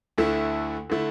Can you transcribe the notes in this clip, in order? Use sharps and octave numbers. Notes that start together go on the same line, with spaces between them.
D2 D3 A3 E4
D3 A3 E4